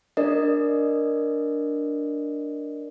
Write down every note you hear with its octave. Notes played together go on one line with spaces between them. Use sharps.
D4 A#4 D5 D#5